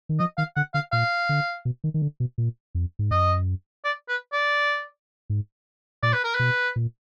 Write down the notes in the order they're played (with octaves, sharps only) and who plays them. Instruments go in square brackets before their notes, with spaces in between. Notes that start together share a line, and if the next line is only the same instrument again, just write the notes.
[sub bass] D#3
[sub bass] F3 [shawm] D#5
[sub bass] D#3 [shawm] F5
[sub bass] D3 [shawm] F#5
[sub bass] D3 [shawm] F5
[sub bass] A#2 [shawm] F5
[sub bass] D3
B2
D#3
D#3
D3
B2
A#2
F2
G#2
[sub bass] F#2 [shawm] D#5
[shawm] D5
B4
D5
[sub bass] G#2
[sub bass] A#2 [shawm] D5
[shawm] B4
A#4
[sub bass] B2 [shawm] B4
[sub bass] A#2